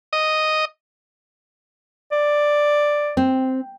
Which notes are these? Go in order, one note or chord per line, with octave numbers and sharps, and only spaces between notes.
D#5
D5
C4